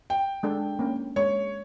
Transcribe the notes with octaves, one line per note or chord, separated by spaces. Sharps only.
G5
G#3 D4 A4
A#3 C#4
G#3 C#5